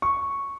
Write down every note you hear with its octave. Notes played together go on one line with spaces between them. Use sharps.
C#6